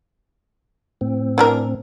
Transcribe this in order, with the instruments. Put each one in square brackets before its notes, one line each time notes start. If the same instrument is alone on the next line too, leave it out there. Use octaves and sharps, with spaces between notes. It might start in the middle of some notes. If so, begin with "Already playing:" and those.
[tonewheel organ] A2 C4
[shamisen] E3 D4 A#4